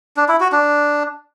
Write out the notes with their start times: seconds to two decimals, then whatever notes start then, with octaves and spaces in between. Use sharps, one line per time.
0.17 D4
0.29 E4
0.40 F#4
0.52 D4